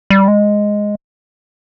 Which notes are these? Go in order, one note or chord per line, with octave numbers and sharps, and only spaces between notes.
G3
G#3